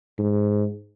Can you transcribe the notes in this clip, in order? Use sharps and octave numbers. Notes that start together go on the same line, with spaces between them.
G#2